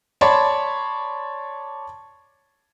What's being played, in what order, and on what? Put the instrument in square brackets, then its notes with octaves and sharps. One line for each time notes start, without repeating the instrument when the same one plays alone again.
[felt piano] C#5 D5 A5 B5 C6